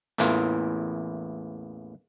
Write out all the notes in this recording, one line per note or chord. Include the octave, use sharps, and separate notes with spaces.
A1 E2 A2 E3 A#3 F4